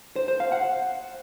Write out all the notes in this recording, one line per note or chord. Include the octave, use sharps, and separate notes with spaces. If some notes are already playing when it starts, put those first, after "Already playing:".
C5
C5
F5
F#5